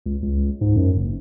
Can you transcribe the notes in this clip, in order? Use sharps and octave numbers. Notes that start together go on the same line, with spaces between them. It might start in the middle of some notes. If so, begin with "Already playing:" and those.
C#2
C#2
G#2
F#2
F#1